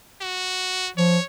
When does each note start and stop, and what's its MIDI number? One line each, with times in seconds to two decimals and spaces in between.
0.21 0.89 66
0.97 1.19 53
0.97 1.24 73